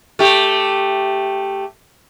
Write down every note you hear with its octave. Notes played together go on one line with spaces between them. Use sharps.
A3 G4